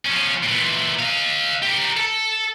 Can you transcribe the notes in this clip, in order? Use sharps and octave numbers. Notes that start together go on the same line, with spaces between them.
F3 C#4
A#2 E3
D#5 F5
G4 A#4
A4